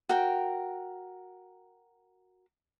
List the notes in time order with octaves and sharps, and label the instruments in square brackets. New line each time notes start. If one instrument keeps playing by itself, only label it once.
[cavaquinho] F#4 A#4 G5